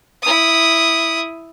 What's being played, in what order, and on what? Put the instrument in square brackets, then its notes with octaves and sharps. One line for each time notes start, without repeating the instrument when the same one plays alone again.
[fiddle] E4 D#6